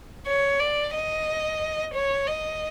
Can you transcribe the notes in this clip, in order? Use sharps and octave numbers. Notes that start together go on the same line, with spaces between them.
C#5
D5
D#5
C#5
D#5